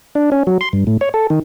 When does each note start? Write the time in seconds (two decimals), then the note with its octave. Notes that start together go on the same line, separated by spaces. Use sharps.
0.15 D4
0.32 C#4
0.47 F#3
0.61 C6
0.73 G2
0.87 A2
1.01 C#5
1.14 A4
1.30 D#3